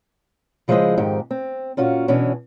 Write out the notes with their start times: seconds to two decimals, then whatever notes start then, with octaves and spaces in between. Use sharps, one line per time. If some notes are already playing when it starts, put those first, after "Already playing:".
0.68 C#3 F3 G#3 E4 C5 D#5
0.98 F2 G#2 D#3 G4
1.31 C4
1.77 A#2 C#4 F4 F#4
2.08 B2 E3 C#4 D4